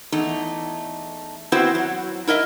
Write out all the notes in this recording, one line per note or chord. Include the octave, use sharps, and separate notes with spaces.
E2 A3 D#4
B3 C4 E4 F#4 B4 C5
F#3
E4 A#4 D#5 E5